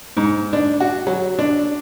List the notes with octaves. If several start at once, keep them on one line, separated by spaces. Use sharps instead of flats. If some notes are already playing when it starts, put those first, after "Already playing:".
G#2
D4
F#4
F#3
D4